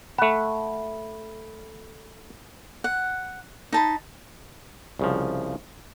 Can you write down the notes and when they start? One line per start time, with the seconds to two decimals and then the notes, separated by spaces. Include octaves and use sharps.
0.18 A3 F#5 B5
2.84 F#5
3.72 D#4 A5 B5
4.99 C2 C#3 F3